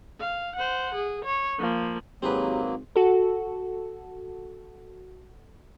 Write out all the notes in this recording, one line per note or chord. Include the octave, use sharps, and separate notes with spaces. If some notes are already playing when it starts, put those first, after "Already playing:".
F5
C5 F#5
G#4
C#5
F3 A#3
G#1 F#3 A#3 C4 G4 G#4 B4
F#4 A4